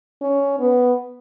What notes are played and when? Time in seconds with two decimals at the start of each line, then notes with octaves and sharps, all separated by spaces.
0.21 C#4
0.59 B3